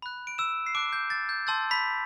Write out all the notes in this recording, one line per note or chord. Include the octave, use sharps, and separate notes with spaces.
B5 F#6
D7
E6 E7
C7
A5 D6 F#6 D7
G6
A6
G6
A5 C6 E6 G6 A6
B5 B6